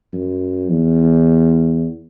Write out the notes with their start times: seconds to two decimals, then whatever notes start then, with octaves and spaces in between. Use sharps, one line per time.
0.13 F#2
0.71 E2